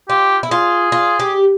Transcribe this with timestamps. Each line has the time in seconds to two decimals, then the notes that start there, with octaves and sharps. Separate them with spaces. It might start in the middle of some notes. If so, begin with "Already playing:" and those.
0.10 F4 G4
0.43 E4
0.51 F4 G#4
0.92 F4
1.20 G4